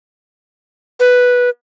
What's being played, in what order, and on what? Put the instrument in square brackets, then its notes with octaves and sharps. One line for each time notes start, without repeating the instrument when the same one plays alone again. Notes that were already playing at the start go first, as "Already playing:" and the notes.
[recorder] B4